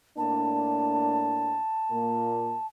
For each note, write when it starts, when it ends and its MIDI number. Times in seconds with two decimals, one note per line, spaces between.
0.18 1.59 45
0.18 1.59 58
0.18 1.59 62
0.18 2.67 81
1.91 2.54 46
1.91 2.54 58